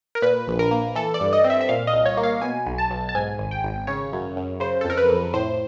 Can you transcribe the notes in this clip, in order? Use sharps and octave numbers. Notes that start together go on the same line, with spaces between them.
A#4
A#2 B4
A#1
A#4
A#3
E3 A4
D5
G2
D#5
C4
E5
E5
A#2 F5
D#5
C2
C#5
A#3
F5
B2 G#5
B1
A5
B1
A5
G#2 G#5
G#1
G5
G#1
C#3 C#5
F#2
F#2
C#3 C5
A4
F2 A#4
B4
F2
A2 C5